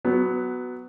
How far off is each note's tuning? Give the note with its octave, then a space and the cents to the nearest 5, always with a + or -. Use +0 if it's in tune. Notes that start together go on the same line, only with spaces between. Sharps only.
F#3 +0 B3 +10